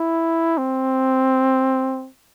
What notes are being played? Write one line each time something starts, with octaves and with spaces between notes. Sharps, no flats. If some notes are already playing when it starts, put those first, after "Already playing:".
Already playing: E4
C4